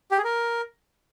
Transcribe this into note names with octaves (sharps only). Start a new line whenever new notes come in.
G4
G#4
A#4